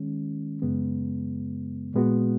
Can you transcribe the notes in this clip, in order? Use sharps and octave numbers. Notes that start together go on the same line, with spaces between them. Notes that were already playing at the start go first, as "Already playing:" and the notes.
Already playing: D#3 G#3 C#4
F#2 C#3 G#3 B3
A#2 G#3 B3 F#4